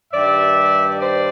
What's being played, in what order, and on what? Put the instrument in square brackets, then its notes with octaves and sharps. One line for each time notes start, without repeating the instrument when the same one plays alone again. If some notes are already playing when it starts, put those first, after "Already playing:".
[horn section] G2 D#3 G3 D5 E5
C5 D5